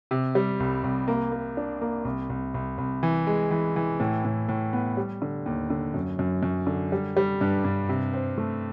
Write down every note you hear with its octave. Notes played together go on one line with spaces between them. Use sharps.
C3
G3
C2
C2
A#3
A#3
D4
A#3
C2
C2
C2
C2
E3
G#3
E3
E3
A2
A2
A2
B3
G3
D3
D#2
D3
F#2
F#2
F#2
D3
G3
G3
G2
G2
C3
C4
A3